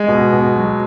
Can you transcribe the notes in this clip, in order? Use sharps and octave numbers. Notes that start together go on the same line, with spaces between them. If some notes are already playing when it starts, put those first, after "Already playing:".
Already playing: G#3
B2
B2
F#3